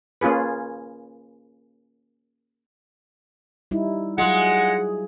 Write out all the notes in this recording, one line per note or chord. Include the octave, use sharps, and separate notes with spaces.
A#3 C#4 F4 G#4 B4
G3 D#4 E4
F#3 G#3 F4 F#5